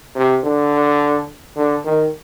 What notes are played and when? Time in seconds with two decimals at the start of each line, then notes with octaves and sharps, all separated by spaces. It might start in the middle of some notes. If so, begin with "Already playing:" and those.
0.15 C3
0.43 D3
1.56 D3
1.84 D#3